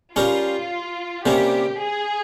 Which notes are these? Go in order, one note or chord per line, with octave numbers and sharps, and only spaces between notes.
G3 C#4 F4 G4 A#4
C3 G3 A#3 C#4 G4
G#4